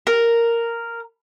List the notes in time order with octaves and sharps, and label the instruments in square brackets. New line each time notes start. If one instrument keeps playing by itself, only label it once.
[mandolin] A#4